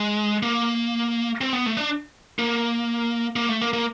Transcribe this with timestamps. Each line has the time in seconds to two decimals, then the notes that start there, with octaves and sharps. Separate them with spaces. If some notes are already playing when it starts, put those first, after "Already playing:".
Already playing: G#3
0.43 A#3
1.41 C4
1.53 B3
1.66 A3
1.77 D4
2.39 A#3
3.36 A#3
3.49 A3
3.61 A#3
3.73 A#3